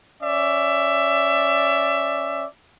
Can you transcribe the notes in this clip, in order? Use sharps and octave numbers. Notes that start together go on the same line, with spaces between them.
C#4 D5 E5